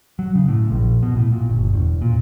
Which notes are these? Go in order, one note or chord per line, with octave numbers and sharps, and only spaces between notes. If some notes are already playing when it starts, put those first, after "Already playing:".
F#3
C#3
A2
A#1
B2
A2
A#2
G1
E1
A#2